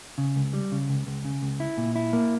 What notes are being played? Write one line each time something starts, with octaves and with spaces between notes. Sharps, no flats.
C#3
C#2
G3
C#3
C#2
C#2
C#3
C#2
E4
A#2
E4
A#3